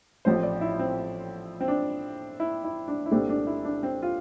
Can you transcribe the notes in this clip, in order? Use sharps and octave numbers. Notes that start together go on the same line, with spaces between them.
A1 A2 F3 C4 C5
D5
E4
C4
C4
D4
E4
E4
D4
E4
C2 A#2 A3 C4 D4
D4
E4
D4
C4
F4